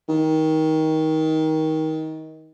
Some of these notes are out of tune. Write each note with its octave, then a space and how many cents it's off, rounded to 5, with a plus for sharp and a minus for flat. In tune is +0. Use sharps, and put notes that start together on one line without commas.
D#3 +20